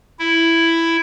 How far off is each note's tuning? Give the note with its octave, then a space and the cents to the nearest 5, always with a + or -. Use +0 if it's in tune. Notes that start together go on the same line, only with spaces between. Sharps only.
E4 +5